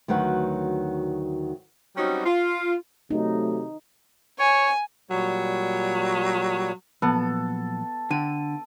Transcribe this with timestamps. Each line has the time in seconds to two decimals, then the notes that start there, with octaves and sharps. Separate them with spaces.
0.08 D2 D#3 F#3 B4 F#5
1.97 F#3 G3 C4 C#4 D#4 F#4
2.26 F4
3.11 C3 F#3 A3 D#4
4.39 C#5 G#5
5.11 A#2 F#3 G3 C#5
7.02 A#2 F3 F#3 B3 A4
8.11 D3 G5 D#7